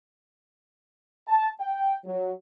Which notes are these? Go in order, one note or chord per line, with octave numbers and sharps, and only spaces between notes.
A5
G5
F#3